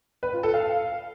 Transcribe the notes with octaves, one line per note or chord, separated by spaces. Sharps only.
B4
F4
A4
F5